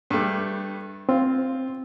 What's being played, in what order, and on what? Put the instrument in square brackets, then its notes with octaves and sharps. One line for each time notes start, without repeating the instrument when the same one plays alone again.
[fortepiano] G2 G3 A3
[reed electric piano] C4 [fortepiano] F4